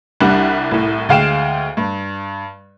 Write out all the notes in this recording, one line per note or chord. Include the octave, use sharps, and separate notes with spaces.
C2 G3 D4 F#5 F#6
C2 A2
D2 G#3 F5 G5 D7 E7
G2